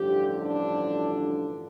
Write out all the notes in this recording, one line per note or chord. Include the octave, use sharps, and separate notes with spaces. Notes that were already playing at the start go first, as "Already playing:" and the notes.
Already playing: A1 G2 D3 F3 G4
D4